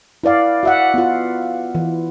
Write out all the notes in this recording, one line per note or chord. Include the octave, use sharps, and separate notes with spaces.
E4 B4 D5 F5
F#4 E5 F#5
B3 F4
E3